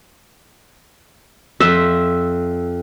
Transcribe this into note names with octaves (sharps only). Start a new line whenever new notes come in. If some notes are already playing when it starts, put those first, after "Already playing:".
F2 E5